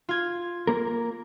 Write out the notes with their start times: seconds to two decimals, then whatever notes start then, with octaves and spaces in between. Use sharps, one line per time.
0.09 F4 G#6
0.67 A#3 A#4